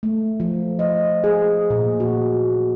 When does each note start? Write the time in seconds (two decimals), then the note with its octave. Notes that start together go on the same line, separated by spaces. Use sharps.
0.03 A3
0.40 F3
0.79 D#5
1.24 G#4
1.70 A#2
2.00 F#4